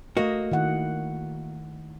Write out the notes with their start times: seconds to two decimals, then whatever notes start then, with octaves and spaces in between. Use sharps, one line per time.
0.17 A3 A#3 F#4 D#5
0.51 D#3 E4 F#5